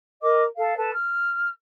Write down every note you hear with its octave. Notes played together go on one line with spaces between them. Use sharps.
A#4 D#5 D6
A4 F5
A4 B4 A5
F6